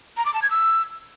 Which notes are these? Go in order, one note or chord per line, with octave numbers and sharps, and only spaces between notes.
A#5
D6
A5
G#6
E6